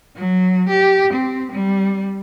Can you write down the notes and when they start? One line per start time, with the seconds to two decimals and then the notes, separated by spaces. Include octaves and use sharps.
0.16 F#3
0.69 G4
1.13 C4
1.52 G3